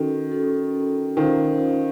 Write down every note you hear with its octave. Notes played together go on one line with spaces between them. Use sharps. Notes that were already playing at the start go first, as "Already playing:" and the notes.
Already playing: D#3 C#4 F#4 A4
C#4 F#4 A4
D#3 C#4 F4 C5 F5